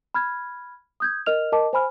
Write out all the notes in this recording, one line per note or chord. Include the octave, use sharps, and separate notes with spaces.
B5 F6 G#6
D#6 G6 G#6
A#4 D#5 F6 F7
A#4 D#5 A5 D6
C5 G#5 B5 F6